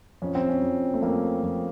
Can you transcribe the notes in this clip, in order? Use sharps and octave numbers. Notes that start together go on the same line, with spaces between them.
F2 C#4
C4
C#4
F2
A3
F2 A#3
F2